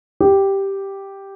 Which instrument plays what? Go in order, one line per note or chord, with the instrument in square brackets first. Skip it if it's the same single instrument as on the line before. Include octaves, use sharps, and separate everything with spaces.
[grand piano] G4